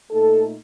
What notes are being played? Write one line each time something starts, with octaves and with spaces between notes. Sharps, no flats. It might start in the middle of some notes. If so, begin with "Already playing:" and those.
A#2 A3 D#4 A4